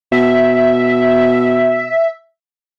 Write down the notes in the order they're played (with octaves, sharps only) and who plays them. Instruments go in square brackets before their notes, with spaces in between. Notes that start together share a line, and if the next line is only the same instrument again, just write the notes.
[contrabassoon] B2 [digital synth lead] E5